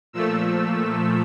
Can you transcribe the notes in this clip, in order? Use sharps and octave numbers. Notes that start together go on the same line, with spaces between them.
A#2 F3 A3 E6